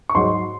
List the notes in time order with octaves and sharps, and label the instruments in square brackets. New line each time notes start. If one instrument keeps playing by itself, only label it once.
[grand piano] C#6
G#2 F#3 C6